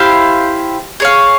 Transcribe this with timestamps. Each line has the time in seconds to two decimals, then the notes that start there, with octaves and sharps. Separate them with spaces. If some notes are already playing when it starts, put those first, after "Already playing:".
Already playing: E4 G4 C5 F5
1.00 G#4 C#5 F5